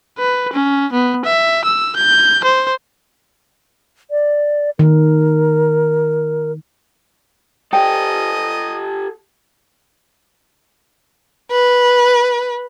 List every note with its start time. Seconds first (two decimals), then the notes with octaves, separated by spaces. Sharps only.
0.18 B4
0.53 C#4
0.93 B3
1.25 E5
1.65 E6
1.96 G6
2.44 C5
4.11 D5
4.79 D#3 A#4
7.73 G4 A4 C5 D5 D#5 G5
11.51 B4